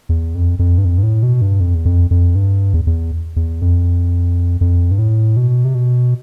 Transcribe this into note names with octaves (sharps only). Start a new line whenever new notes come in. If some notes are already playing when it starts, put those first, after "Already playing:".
E2
F2
F2
G2
F2
G2
A2
B2
G2
F2
E2
F2
F2
G2
E2
E2
E2
F2
F2
G2
A2
B2
C3
B2